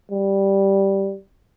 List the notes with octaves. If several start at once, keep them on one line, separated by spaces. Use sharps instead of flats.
G3